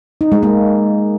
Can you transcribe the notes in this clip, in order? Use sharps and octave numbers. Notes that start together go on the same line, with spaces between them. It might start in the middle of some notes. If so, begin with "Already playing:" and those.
D#4
G#3
A#3